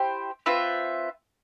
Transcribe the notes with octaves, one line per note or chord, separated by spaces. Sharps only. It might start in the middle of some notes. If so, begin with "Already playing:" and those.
Already playing: E4 G4 C5 G5
C4 F4 B4 E5